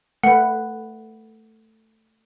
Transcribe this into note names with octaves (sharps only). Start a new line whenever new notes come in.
A3 B4 F#5